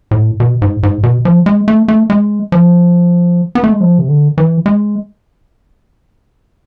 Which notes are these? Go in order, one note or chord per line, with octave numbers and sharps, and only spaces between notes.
A2
B2
G#2
G#2
B2
F3
G#3
A3
A3
G#3
F3
B3
A3
G#3
F3
C3
D3
E3
G#3